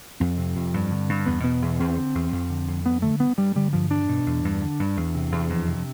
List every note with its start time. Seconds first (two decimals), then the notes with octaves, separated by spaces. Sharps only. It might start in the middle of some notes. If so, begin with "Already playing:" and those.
0.20 F2 C4
0.38 C3
0.55 F2
0.74 G2
0.91 D3
1.09 G2
1.26 E2 B3
1.44 B2 B3
1.62 E2
1.79 E2 C4
1.97 D3
2.15 E2
2.32 F2
2.50 D3
2.68 F2
2.86 G2 B3
3.02 D3 A3
3.20 G2 B3
3.38 G2 G3
3.55 D3 G3
3.73 G2 F3
3.91 E2 D4
4.08 B2
4.26 E2
4.45 G2
4.62 D3
4.79 G2
4.97 E2
5.15 C3
5.32 E2
5.50 F2
5.67 C3